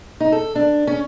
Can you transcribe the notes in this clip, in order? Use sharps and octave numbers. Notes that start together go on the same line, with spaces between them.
D#4
A4
D4
C#4